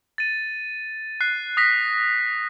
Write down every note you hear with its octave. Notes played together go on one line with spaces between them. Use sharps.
A6 D#7
F#6 C7
D#6 A#6 B6